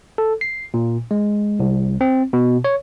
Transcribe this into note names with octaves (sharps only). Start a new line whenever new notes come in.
A4
C7
A#2
G#3
C2
C4
B2
C#5